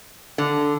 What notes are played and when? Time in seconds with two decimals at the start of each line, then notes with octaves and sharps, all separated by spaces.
0.38 D3